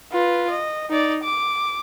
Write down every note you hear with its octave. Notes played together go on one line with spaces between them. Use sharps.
F4 B4
D#5
D#4 D5
D6